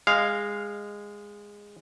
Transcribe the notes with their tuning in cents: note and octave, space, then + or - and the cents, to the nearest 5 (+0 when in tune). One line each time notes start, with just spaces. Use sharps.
G#3 -15 F5 +0